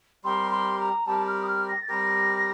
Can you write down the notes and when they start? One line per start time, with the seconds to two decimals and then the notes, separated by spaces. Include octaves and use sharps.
0.24 G3 C4 G4 A#4 C6
0.51 C6
0.79 A#5
1.06 G3 C4 G4 A#4 A5
1.27 F6
1.42 D#6
1.47 F6
1.68 A#6
1.82 A6
1.88 G3 C4 G4 A#4 A#6